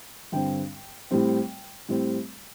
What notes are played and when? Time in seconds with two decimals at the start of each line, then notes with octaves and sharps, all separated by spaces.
0.32 G2 D3 G3 C4 G5
1.11 A2 G3 C4
1.89 A2 G3 C4